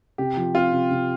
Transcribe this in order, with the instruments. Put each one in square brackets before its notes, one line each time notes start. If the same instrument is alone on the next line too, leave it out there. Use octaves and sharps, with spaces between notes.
[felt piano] C3 [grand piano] G4
[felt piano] F3
[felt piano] C4 [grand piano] F4
[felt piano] C3
C3